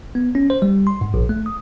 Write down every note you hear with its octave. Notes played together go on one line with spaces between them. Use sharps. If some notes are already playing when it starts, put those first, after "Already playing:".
B3
C#4
C5
G3
C6
G#2
A#1
A3
D#6